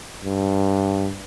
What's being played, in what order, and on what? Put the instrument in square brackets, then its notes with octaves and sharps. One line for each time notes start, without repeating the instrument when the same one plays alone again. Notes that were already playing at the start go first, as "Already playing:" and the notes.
[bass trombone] G2